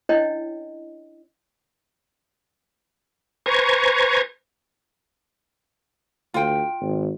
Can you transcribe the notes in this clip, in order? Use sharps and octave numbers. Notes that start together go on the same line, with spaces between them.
C#4 D4 E4 C#5 D#5 G5
B4 C5 G#5 A#5 C#6 G#6
D2 F4 G5
G#1